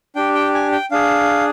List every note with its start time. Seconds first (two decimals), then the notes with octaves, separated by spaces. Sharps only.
0.15 D4 G4 G5
0.35 G5
0.54 G#5
0.72 G5
0.91 D4 G#4 F5